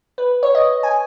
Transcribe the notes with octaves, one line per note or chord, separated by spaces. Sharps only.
B4
C#5
D#5
G#5